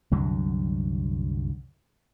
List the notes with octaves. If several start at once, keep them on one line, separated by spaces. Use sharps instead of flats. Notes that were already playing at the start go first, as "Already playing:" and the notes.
C2 F#2 D3 F#3